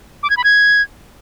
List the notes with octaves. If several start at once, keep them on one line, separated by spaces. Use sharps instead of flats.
D6
G#6
B5
G#6